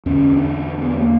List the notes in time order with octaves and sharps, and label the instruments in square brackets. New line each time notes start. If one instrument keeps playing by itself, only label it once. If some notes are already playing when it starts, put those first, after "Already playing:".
[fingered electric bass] E2 D3 C#4
D4
B3
A#3